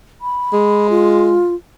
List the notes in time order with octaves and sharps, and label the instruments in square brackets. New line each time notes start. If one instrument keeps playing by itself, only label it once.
[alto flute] B5
[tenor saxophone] G#3
[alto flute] F4